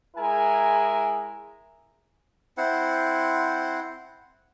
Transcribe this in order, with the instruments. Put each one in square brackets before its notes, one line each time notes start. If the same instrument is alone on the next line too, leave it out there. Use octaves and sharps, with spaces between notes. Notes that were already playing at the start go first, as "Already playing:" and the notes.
[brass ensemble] G#3 E4 A#4 G#5
[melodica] C4 E4 C5 F#5